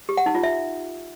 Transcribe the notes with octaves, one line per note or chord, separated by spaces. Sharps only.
G4
F#5
D#4
F4
E5